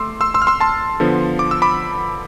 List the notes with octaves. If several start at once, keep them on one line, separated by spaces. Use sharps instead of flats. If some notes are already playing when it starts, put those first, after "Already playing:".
Already playing: A3 C6 D6 E6
C6 E6
C6 E6
F6
C6 E6
A5 C6
D3 F3 B3
D6
E6
B5 D6